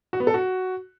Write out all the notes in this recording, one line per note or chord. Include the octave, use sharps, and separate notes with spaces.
F#4
B3
A4
F#4